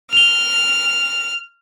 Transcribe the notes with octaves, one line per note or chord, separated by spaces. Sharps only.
F6 F7 G7